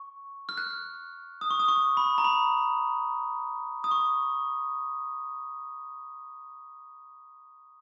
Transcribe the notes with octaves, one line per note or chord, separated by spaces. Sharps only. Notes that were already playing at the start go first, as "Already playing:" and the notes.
Already playing: C#6
F6
F#6
D#6
C#6
D#6
C#6
B5
A#5
B5
D#6
C#6